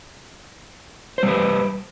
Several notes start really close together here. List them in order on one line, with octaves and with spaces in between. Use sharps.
C5 G3 B4